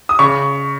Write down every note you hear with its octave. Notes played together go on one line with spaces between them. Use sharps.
D#6
C#3 C#6